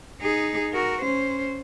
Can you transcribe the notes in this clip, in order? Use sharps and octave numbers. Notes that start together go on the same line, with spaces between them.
D#4 G#4
F#4 A#4
C#4 C5